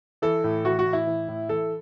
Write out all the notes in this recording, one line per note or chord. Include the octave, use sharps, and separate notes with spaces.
E3 A4
A2
E3 F#4
F#4
A2
E4
E3
A2
E3 A4